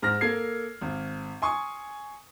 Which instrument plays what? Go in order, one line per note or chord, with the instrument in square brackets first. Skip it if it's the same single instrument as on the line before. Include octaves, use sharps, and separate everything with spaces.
[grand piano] G#2 F6 A#6
A#3 A4 G#6 C7
G#1
G#5 C6 C#6 D#6